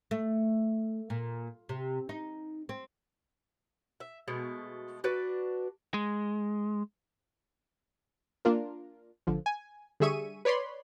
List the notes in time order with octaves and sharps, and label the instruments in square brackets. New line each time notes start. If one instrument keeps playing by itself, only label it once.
[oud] A3
A#2
C3
D#4
C4
[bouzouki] E5
B2 G#3 A3
D4 F#4 B4 D5
[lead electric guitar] G#3
[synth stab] A#3 D4 F4 A#4
A1 D3 F3
G#5
D3 G3 G#4 E5 C#6 D#7
B4 C#5 D5 B5 C6